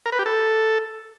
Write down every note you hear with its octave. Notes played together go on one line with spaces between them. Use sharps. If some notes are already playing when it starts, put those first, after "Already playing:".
A#4
B4
G4
A4